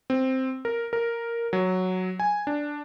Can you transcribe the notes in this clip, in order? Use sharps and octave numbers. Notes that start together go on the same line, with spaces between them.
C4
A#4
A#4
F#3
G#5
D4